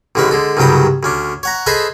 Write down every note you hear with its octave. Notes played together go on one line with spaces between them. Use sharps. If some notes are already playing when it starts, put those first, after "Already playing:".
A1 D3 G#3 C#4 B4
D3 G#3 A4
C2 G2 C#3 F#3 G5 D#6
D2 C#4 D4
C#5 F#5 A#5
G#4 A4 B4 C5 D#5 E5